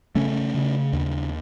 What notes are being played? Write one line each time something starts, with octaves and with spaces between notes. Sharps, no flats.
C#3 A3 C#4
C#3
D#2